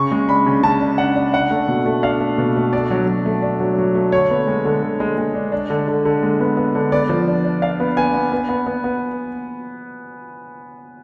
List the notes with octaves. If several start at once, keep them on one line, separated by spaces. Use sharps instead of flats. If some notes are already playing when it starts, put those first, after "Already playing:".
Already playing: C#3 C#6
G#3
D4 B5
C#3
C#3 A5
D4
D4 F#5
D4
D4 F#5
A3
B2
A3
D4 F5
A3
B2
A3
D4 D5
F#3
F#3
A3
D4
F#3
F#3
A3
D3 C#5
B3
G#3
D3
D3
G#3
G#3
D4
D4
D3
D3
D3
G#3
B3
B3
D3
B3 D5
F3
D4
D4
D4 F5
B3
B3 G#5
B3
B3
B3
B3
B3